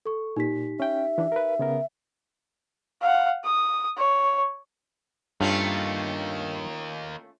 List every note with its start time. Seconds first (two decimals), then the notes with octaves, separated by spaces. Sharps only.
0.06 A4 C#6
0.37 A#2 D#4 G4 B6
0.80 C#4 E5 G5
1.18 E3 D4
1.32 A#4 B4
1.59 C#3 B3 A#4
3.02 F5 F#5
3.44 D#6
3.97 C#5
5.41 G2 D#3 A3 A#3 C#4 F4